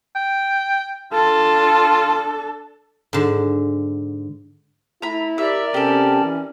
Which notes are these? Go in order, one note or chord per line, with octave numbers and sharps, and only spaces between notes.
G5
D4 F4 A4
G#2 D3
A3 E4 A#5 B5
G4 A#4 D5 E5
C3 C#4 G4 A4
E3